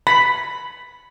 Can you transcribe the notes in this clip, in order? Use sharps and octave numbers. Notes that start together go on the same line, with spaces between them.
B5